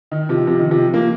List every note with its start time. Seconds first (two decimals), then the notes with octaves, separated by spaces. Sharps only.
0.11 D#3
0.29 C3 F3
0.47 C3 F3
0.59 D#3
0.71 C3 F3
0.94 F3 A#3